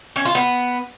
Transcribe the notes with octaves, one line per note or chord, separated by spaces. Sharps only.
C#4
F4
B3